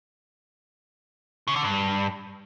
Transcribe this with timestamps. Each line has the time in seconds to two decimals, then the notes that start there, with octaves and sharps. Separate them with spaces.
1.48 C#3
1.56 D3
1.64 G2